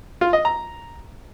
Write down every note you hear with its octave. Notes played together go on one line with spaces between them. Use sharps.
F4
D#5
A#5